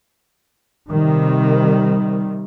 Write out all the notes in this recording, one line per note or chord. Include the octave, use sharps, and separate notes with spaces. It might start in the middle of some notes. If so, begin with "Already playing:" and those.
C3 D#3 G3